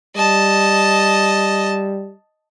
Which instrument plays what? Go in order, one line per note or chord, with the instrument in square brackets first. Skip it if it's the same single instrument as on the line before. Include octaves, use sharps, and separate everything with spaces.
[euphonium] G3 [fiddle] D#5 A5